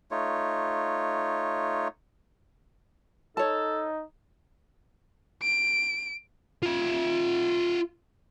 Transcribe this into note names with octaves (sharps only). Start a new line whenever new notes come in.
A3 D#4 F4 C#5
D#4 A4 C#5 A5
D7
F4 E5